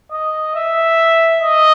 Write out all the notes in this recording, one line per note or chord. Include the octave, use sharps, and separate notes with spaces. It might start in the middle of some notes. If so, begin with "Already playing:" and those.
D#5
E5
D#5